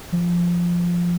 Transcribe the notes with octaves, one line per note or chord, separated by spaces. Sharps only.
F3